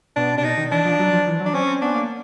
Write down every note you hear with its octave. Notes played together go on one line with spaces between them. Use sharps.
B2 D4
C3 D4
B2 D#4
D#3
E3 D4
F3
F#3
F3
E3
F#3
D4
C4 C#4
C4
B3 D4
A#3